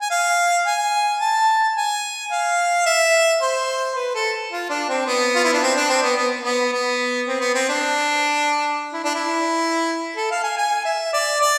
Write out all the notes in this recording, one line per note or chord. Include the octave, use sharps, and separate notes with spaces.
G#5
F5
G#5
A5
G#5
F5
E5
C5
B4
A4
F4
D4
C4
B3
F4
E4
D4
C4
D4
C4
B3
B3
B3
B3
C4
B3
C4
D4
E4
D4
E4
A4
F5
G#5
G#5
E5
D5
D5